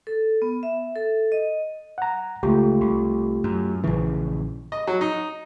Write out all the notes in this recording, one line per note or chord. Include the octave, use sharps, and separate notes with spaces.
A4
B3
E5
A4
D#5
F#5 A#5
C#2 A3 F4 G4
C2
F#2
A#1 C#3 E3
D#5
F#3
D#4